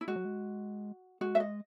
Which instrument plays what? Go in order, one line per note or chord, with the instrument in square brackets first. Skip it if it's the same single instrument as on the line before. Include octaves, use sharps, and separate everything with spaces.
[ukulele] E4
[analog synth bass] G#3 [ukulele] F#4
[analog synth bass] F#3
G#3
[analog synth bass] G#3 [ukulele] F#4
[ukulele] E5
D#5